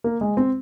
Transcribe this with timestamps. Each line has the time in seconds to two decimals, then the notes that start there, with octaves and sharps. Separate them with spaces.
0.04 A#3
0.21 G#3
0.37 C4